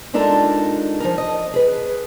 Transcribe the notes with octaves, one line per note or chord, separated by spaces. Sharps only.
G#3 D4 D#4 F4 A4 A#4
F3 G#4 A#4
D#5
G#4 B4